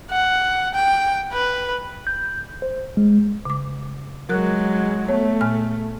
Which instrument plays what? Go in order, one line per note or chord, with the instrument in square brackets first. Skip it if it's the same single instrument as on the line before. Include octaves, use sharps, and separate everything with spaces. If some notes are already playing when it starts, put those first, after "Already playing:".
[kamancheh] F#5
G5
B4
[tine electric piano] G6
C5
G#3
[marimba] C#3 D6
[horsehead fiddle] F#3 G#3 [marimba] A#4 F#6
[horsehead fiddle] A3 [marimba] B3 C#5
[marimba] A#2 G#5 F6